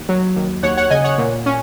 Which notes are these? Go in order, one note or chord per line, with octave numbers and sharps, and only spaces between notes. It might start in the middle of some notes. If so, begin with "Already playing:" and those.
Already playing: D#2 F#5
F#3
D#2
D#2 C#5 F#5
C#5 F#5
C#3 D#5 G#5
C#5 F#5
A#2
C#4